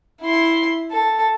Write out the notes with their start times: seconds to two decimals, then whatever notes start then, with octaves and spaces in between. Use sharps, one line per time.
0.22 E4 C6
0.91 A4